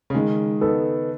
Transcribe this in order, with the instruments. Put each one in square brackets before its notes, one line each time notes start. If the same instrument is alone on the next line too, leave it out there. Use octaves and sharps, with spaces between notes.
[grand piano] C#3
[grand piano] D#3 [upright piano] G#3
[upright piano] B3 D#4 A4